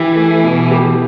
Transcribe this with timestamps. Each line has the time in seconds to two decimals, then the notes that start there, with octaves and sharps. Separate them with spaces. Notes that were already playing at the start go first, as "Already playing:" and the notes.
Already playing: E3 E4 G4
0.16 A3
0.43 B2
0.71 G4